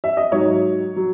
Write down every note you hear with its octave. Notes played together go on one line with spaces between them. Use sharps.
E5
D#5
G#2 F#3 C#5
F#3